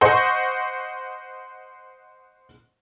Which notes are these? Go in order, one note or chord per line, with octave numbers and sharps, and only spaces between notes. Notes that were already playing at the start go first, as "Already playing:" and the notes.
C5 D#5 F#5 C6 C#6